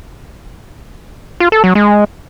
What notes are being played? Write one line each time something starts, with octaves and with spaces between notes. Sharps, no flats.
F4
A4
F#3
G#3